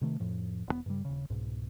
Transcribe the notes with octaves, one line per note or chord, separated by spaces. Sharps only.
C3 D#3 A3
F2 A2 F3
E1 B2 B3
G2 C#3 G3
D#1 C#3
C2 G#2 B2